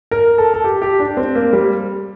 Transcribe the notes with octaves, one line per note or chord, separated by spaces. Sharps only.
A#4
A4
A4
G4
G4
D4
C4
A#3
G3